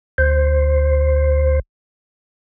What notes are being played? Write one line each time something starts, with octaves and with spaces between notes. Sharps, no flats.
D2 C5